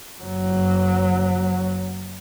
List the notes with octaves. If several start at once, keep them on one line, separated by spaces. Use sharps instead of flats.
F#1 F#3